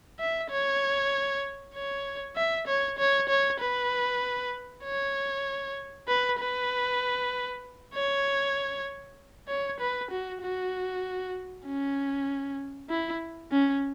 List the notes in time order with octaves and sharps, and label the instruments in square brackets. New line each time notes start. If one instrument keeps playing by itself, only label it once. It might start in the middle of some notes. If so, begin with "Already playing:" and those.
[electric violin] E5
C#5
C#5
E5
C#5
C#5
C#5
B4
C#5
B4
B4
C#5
C#5
B4
F#4
F#4
C#4
E4
C#4